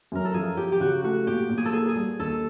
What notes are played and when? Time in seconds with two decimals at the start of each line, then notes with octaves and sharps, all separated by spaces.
0.12 F#2 A#4
0.25 A4
0.34 F3 G#4
0.57 F3 G4
0.72 G4
0.80 C#3 F#4
1.04 A3 F#4
1.27 A#2 G4
1.50 A#2
1.58 G#4
1.65 A4
1.73 A#3 G#4
1.89 G#4
1.95 G3
2.20 D#2 A4